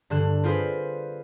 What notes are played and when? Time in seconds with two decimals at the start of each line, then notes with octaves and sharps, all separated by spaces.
0.10 G2 D3 F#6 E7
0.43 C4 F4 G#4 B4 C5